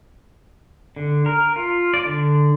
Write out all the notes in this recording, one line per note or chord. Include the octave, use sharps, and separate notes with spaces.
D3
A#4
F4
D5
D3